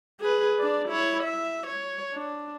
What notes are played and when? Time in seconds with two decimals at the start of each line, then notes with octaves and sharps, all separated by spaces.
0.20 G#4 B4
0.59 D4 D5
0.89 E4 C#5
1.23 E5
1.67 C#5
2.13 D4